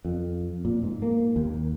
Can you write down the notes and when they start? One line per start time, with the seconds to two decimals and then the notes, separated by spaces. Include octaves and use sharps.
0.05 F2
0.65 A#2
0.83 G#2
1.02 A#3
1.36 D#2